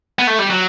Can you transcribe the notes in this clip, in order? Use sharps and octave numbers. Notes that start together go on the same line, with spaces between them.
B3
A3
G3
F#3